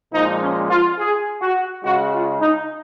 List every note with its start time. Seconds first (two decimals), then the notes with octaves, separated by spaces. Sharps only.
0.12 A#2 F3 G#3 D#4
0.40 C#4
0.70 F4
0.98 G#4
1.41 F#4
1.83 C#3 G#3 F#4
2.12 F4
2.40 D#4